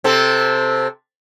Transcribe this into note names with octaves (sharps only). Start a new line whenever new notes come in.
C3 C4 A4